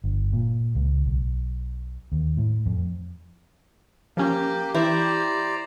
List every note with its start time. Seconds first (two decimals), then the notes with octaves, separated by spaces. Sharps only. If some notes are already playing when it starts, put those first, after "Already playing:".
0.04 G1
0.33 A#2
0.75 C#2
1.06 B1
2.12 D#2
2.37 A2
2.66 F2
4.17 F3 A#3 C#4 G4
4.75 E3 E4 C5 D5 A#5